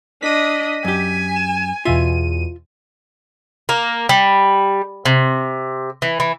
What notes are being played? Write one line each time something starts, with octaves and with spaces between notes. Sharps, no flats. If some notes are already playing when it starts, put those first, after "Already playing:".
D4 D#5 B6 D#7
F#2 G4 G#5
E7
E2 B2 F4 E5 D#7
A#3
G3
C3
E3
E3